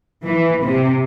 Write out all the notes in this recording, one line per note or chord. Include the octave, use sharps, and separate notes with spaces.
E3
C3